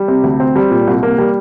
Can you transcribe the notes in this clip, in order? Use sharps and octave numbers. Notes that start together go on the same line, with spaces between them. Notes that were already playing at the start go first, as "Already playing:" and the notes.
Already playing: G3
C3
D2
C4
G3
A#2
C2
A#3
G3